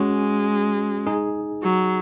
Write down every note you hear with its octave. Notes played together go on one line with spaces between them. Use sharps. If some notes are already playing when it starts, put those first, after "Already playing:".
Already playing: G#3 C#4 F#4
D#4 G#4
F#3